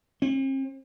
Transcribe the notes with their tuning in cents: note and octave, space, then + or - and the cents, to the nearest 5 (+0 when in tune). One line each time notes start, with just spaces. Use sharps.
C4 +45